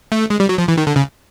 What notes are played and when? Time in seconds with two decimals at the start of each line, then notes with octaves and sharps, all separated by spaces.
0.12 A3
0.30 G#3
0.40 G3
0.49 F#3
0.58 F3
0.68 E3
0.77 D#3
0.87 D3
0.96 C#3